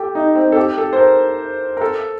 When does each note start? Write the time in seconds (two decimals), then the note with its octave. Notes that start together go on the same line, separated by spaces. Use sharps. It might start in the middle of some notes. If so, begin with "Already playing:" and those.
Already playing: G4 A4
0.15 D#4
0.35 C4
0.52 A4
0.56 G4
0.78 A4
0.93 C5
0.98 A#4
1.77 A#4
1.81 A4